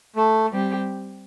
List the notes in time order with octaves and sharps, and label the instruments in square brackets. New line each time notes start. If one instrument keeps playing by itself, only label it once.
[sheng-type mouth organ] A3
[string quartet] G3 C4 G4